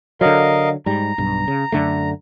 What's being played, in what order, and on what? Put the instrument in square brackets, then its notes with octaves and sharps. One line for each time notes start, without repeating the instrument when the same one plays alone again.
[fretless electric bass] D3 F#3 [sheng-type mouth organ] A#4 D#5 F5
[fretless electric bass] G#2 G3 [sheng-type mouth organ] A#5
[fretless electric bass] B1 G2
C#3
F#2 D3 A3